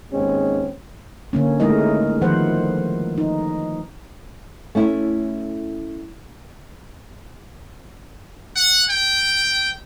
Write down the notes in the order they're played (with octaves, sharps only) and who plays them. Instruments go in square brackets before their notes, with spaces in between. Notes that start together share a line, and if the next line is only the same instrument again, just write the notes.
[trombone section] D#2 G#2 G#3 C4 C#4
[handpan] D3 A#3 C#4
G#3 A3 D#4 E4 A#4 D#5
D#3 F3 B4 C5 F#5
D#4
[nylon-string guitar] A3 C#4 E4
[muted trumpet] F#5
G5